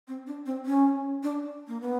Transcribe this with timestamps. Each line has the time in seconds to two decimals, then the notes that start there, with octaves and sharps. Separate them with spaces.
0.08 C4
0.27 D4
0.46 C4
0.66 C#4
1.23 D4
1.68 A#3
1.81 B3